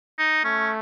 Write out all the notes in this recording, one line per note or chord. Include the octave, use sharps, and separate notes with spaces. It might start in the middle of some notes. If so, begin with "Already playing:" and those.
D#4
A3 C#4